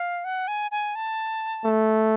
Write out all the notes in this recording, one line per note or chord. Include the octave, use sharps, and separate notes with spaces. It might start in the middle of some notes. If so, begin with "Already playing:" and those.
Already playing: F5
F#5
G#5
G#5
A5
A3